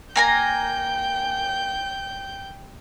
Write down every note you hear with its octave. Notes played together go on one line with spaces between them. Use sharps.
A#3 G5 G#5 A#5 G6